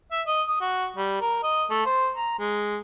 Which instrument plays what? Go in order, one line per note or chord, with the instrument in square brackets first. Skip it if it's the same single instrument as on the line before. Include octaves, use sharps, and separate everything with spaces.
[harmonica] E5
D#5
D#6
F#4
G3
A#4
D#5
A3
C5
A#5
G#3